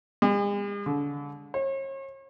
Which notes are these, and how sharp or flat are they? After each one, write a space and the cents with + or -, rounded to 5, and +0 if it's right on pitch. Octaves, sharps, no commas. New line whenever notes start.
G#3 -45
D3 -35
C#5 -40